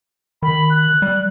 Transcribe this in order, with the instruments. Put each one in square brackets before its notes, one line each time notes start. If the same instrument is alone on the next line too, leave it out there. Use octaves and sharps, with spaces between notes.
[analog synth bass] D#3 [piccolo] B5
[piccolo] F#6
[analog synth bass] G3